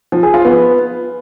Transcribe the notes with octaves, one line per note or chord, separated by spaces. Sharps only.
F3
G#4
F4
B3